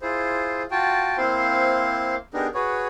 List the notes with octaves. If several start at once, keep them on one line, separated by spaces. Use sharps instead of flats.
E4 F4 G#4 C5
F4 F#4 G5 A5
A#3 C4 E4 C5 F5 C6
B3 D4 D#4 G4 G#4 A#4
F#4 G#4 B4 C#5